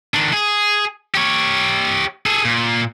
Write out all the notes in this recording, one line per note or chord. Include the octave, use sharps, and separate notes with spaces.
D#3 D4
G#4
G4 C#5
G#4 A4
A#2